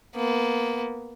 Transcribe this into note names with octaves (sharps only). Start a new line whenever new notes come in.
A#3 B3